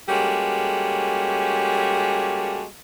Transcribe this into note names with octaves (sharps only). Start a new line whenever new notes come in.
G3 G#3 A#3 C#4 F#4 A4